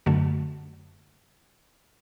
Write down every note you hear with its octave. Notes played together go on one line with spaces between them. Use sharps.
F#2 D3 F#3 A3